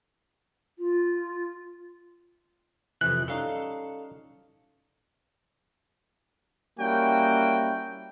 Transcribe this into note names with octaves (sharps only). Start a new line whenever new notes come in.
F4
F2 C3 E3 F#6
G3 C#4 D#4 A4 F5
G3 A#3 C#4 E4 F#4 G5